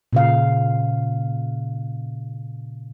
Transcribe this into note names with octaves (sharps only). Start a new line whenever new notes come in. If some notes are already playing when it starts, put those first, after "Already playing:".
A#2 C#3 F5